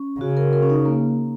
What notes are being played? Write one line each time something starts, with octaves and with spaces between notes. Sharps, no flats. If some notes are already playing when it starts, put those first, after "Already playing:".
Already playing: C#4
C#3 F#4
A#4
A#4
C#4
D#4
A#3